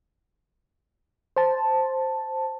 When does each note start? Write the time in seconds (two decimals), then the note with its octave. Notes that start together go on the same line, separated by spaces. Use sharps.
1.36 C5 A5